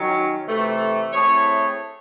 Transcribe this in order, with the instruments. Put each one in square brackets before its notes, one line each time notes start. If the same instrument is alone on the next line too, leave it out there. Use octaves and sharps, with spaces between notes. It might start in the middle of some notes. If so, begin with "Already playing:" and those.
Already playing: [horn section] D#3 F#3 C#4
C3 E3 A3
A3 C4 E4 G#4 C#5